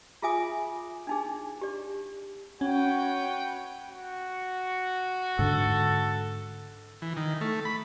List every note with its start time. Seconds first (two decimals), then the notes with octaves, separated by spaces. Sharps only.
0.22 F4 G#4 E5 G#5 D#6
1.07 D4 D#4 G#4
1.61 G4 D5
2.61 C#4 F#4 B4 C#5 G5
3.90 F#4
5.39 G#2 D3 A4
7.02 E3
7.16 D#3
7.41 A3
7.65 B5